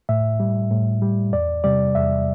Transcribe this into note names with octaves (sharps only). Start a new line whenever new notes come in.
A2 E5
G3
A2
G3
E2 D5
C3 G3 D5
E2 E5